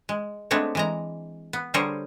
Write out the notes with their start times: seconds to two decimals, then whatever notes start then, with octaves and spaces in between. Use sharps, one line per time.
0.09 G#3
0.51 G#3 A3 B3 C4 D4 C#5
0.75 E3 G#3 A#5
1.53 B3
1.74 D3 G3 G#4 A#4 C5 C#5